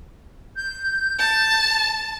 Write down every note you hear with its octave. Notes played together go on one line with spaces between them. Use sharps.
G6
A5